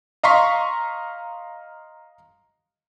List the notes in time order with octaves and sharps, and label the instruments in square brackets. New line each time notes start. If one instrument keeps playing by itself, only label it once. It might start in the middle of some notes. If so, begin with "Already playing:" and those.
[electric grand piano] D#5 F5 A#5 C6 C#6 B6